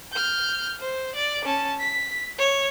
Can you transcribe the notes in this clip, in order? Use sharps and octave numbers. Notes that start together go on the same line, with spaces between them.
F6 G6
C5
D5
C#4 A5
B6
C#5